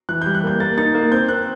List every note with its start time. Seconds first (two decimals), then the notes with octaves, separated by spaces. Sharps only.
0.09 E3 F#6
0.22 G3 G6
0.35 F#6
0.44 A#3 G6
0.60 A#3 A6
0.78 D#4 A6
0.95 A#3
1.12 C4 G6
1.29 C4 F#6